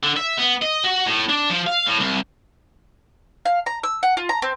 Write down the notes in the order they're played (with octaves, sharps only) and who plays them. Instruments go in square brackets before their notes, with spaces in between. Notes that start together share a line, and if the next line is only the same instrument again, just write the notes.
[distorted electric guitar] D3
E5
B3
D#5
F#4
A2
D4
F3
F5
A2
C2
[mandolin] F5
A#5
E6
F#5
F4
A#5
C4